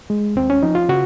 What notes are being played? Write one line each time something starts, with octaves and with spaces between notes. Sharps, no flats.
G#3
D#2 C4
C#4
F3 D#4
F4
C#3 F#4